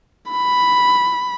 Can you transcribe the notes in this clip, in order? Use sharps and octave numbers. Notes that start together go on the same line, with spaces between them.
B5